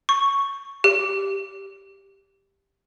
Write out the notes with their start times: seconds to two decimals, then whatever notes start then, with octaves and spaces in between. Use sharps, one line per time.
0.09 C#6
0.84 G4